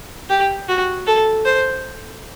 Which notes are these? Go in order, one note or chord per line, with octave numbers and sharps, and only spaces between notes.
G4
F#4
A4
C5